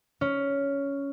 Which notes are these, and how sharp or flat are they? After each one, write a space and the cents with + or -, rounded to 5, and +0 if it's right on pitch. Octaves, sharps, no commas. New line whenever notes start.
C#4 +10